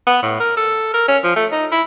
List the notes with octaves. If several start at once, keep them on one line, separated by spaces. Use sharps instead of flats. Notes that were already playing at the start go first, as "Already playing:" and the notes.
B3
A2
A#4
A4
A#4
C#4
F3
A3
D#4
E4